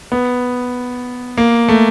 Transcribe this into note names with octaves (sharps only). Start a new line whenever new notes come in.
B3
A#3
A3